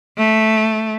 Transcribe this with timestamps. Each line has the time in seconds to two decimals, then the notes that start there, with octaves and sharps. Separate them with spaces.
0.17 A3